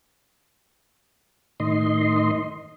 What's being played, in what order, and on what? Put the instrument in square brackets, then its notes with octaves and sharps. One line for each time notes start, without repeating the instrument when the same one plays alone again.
[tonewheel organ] A2 D#3 D#5 C6